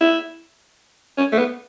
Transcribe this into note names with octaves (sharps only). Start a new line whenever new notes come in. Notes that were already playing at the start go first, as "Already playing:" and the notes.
E4
C#4
A3
B3